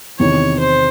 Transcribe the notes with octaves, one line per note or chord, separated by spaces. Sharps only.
E2 C3 D#3 C#5
C5